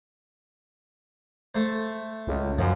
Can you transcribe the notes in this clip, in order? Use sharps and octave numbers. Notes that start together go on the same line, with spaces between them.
A3 C5
C#2
F#2 F3